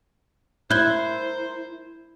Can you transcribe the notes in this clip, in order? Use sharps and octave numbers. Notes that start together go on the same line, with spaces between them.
E4 A#4 C5 F#6 G6 G7